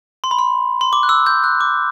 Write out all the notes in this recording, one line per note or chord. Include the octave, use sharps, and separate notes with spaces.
C6
B5
C6
C6
D6
F#6
E6
G6
F#6
D6